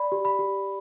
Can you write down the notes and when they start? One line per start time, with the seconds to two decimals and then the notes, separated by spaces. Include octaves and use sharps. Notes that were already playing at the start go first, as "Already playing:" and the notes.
Already playing: D5 B5
0.12 G4
0.25 B5
0.39 G4